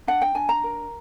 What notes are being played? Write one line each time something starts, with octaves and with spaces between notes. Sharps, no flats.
D4 F#5
G5
D4 G#5
A#5
A#4